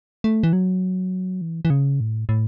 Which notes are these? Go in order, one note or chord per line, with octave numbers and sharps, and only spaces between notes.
A3
E3
F#3
E3
E3
C#3
A2
A2